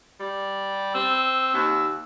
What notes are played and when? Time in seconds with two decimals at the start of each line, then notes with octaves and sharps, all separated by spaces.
0.19 G3
0.94 C4 E6
1.54 D#2